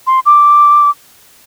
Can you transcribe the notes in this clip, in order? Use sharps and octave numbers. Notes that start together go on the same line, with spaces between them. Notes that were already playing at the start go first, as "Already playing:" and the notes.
C6
D6